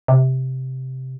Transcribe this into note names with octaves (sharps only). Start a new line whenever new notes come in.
C3